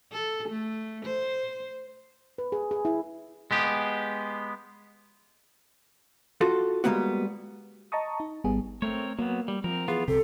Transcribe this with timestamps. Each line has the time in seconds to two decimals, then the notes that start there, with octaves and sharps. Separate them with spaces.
0.12 A4
0.49 A3
1.05 C5
2.38 B4
2.52 G#4
2.71 G#4
2.85 E4
3.51 G#3 B3 G4
6.41 F4 F#4 A4
6.84 G3 G#3 A#3 B3 F#4
7.92 D#5 A5 A#5 C#6 D#6
8.20 D#4
8.44 G#1 G3 B3 G#4
8.82 A3 C4 A#4 C#5
9.19 F#3 A#3 B3
9.48 G3
9.64 F3 C4 A#4
9.88 E3 B3 F4 G#4
10.08 C2 C3 G4 A4